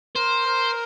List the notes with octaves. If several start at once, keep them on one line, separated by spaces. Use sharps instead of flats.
A#4 C5
A#4